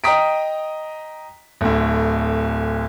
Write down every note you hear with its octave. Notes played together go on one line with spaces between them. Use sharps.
D#5 G5 A#5 D#6 B6 D7
D1 D2